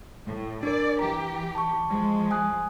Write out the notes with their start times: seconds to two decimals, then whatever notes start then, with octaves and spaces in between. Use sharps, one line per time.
0.25 A2
0.63 D4 A#4 D5
0.99 E3 G4 A#5
1.55 A5 C#6
1.90 F3 G#3
2.31 G#5 D#6 F#6